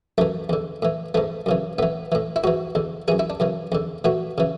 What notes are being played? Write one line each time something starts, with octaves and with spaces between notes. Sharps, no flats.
F#2 E3 A3
E2 D3
A2 E3
G#2 E3 A3
F#2 C#3 E3
A2 E3 B3
A2 E3
E4
G#2 E3 F#4
E2 D3
F#2 E3 G#4
E4
D4
F#2 C#3 E3
E2 D3
A2 E3 F#4
C#3 E3